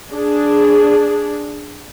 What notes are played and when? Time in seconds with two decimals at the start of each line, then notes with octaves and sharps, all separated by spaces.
0.13 D4 G#4